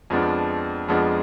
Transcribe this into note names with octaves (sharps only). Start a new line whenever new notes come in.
F2 F3 G#3 B3 D4
F2 F3 G#3 B3 D4